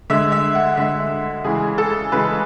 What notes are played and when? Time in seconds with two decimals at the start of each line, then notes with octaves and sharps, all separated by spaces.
0.10 D3 G#3 E5
0.32 E5
0.55 F#5
0.77 D3 G#3 E5
1.44 C#3 E3 G#3 G#4
1.78 A4
2.12 C#3 E3 G#3 B4